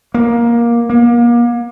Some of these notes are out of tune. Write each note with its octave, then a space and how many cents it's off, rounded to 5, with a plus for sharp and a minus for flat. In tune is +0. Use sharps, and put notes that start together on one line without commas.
A#3 +15
A#3 +35